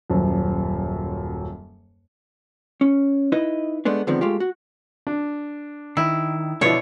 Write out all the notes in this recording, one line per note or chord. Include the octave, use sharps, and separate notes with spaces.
D#1 F#2
C#4
D#4 E4 B4 D#5
G#3 A3 B3 D4
D3 D#3 F3 G#3 B3 C4
G#3 A3 F4 G4
F#4
D4
D#3 E4
B2 D3 F3 E4 C#5 D5